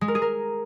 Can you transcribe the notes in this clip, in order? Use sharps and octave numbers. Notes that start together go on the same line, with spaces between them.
G#3
A#4
G#4
A#4